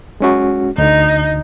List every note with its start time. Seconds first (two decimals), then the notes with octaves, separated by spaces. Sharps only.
0.20 G#3 C#4 F#4
0.78 D2 D3 D#4